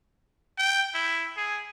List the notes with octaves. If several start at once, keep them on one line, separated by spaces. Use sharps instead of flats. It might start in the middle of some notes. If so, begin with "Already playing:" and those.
G5
E4
G#4